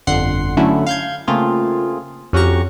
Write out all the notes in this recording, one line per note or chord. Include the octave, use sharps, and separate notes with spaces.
G1 F2 D3 F#5 C6 C7
D3 F#3 A3 C#4 E4
F5 G6 G#6
C#3 A3 A#3 C4 F4 G#4
F2 C#4 F#4 G4 A#5 C#6